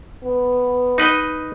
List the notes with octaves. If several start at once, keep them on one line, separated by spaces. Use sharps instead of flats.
B3
D#4 B4 D#5